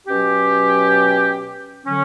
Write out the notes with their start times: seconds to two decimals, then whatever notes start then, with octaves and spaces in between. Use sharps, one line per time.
0.07 B2 F#3 C#4 G4
1.85 D3 F#3 C#4